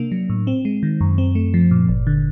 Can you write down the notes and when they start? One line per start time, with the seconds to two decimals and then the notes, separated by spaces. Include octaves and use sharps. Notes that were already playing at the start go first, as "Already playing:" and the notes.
Already playing: C3 A#3 D4
0.12 F#3
0.29 A2
0.47 C4
0.65 G#3
0.83 D#3
1.01 F#2
1.18 C4
1.35 A3
1.54 F3
1.71 A#2
1.89 G1
2.07 D3